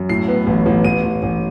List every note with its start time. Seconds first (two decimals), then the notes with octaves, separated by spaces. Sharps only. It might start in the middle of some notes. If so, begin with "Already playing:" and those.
Already playing: F#2
0.09 A2 C7
0.28 B3
0.47 A1
0.66 A1
0.84 A1 D#7
1.04 A1
1.23 A1